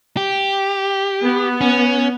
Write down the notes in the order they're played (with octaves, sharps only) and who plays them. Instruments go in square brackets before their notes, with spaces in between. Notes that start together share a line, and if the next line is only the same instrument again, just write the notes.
[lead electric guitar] G4
[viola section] B3
[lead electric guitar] C#4